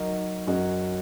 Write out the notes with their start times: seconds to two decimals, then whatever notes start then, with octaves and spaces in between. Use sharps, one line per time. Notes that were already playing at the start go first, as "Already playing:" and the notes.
Already playing: F#3 D#4 A#4 D#5
0.47 F#2 F#3 C#4 F#4 D#5